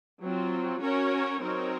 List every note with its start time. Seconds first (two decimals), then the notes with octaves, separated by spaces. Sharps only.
0.22 F#3 C4 F4
0.81 C#4 F#4 A#4 C#5
1.40 F#3 C4 D#4 A#4 C#5